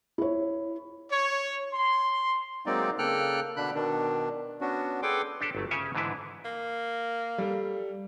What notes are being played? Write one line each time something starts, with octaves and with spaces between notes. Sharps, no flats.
E4 C#5
C#5
C6
F#3 G#3 A#3 C4 D#4 D5
C#3 A#3 A4 G5 F6 F#6
B2 D3 D4 B5 F#6
B2 D#3 D4
B3 C#4 D4 F#4
G#4 A4 B4 G5 C6 D6
D4 G4 A4
G1 F#3 A3
C#3 C#4 G4 C#5 E5 G#5
G#2 D3 E3 D4 E4 B4
A#3
G3 A4